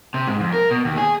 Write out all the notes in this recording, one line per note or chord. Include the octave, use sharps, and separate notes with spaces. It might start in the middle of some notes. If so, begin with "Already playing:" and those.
C3
G#2
F2
A#4
B2
D#2
G#4